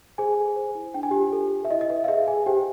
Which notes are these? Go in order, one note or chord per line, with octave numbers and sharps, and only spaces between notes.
G#4 C5 G#5
A4
C5
E4
D4 G5
G#5
F4 G4 G5
A4
A4
E5
E4 D#5
D#5
B4 E5
F5
G#4 E5
G#4 G#5
G4 C5 G5